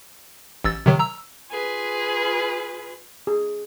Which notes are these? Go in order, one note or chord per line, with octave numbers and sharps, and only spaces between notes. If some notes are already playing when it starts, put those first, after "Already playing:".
A1 E6 A6
C3 D#3 F#3
A#5 E6
F4 G#4 B4
G#4